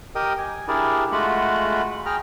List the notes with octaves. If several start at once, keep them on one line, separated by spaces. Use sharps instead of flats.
G4 A#4 D#5 G5 D#6
G#5
D4 E4 G4 G#4 A#4 D5
G#3 A3 F4 F#4 F#5 B5
G#4 G5 A#5 F6